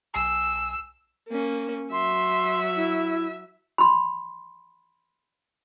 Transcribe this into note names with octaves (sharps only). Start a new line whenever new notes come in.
B1 G#5 E6 C7
A#3 C#4
F#3 E5 C6
E4
B5 C6